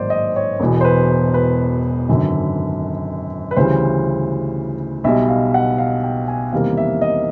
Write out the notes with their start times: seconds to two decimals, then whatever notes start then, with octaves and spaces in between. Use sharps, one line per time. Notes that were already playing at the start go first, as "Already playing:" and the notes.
Already playing: A1 G#2 D#3 F#3 A#3 C5 D5
0.10 D#5
0.36 C#5
0.60 E1 E2 B2
0.81 C5
0.85 B4
1.34 B4
2.09 G#1 F#2 D3
3.51 B4
3.57 D2 C#3 E3 G3 C5
5.04 B1 B2 G3 E5
5.29 F5
5.54 F#5
5.78 F5
6.04 G5
6.28 G#5
6.53 E2 C3 D#3 G3 A#3 F5
6.77 E5
7.01 D#5